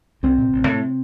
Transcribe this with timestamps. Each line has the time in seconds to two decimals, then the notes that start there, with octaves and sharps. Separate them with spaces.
0.23 C2 C3 C4
0.38 A#2
0.52 A1
0.68 A2